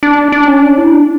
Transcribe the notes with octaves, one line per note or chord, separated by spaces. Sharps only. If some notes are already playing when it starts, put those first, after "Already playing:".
D4
D4
C#4
D4
E4
D4